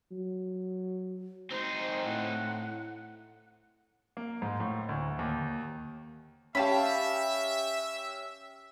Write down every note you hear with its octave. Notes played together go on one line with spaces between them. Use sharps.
F#3
C4 D#4 C5
A2 F#5
A#3
G#2
A2
D2
D#2
C#4 G4 E5 F5 A5 B5